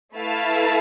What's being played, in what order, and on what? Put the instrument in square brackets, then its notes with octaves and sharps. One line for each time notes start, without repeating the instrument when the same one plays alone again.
[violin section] A3 E4 B4 F5 A5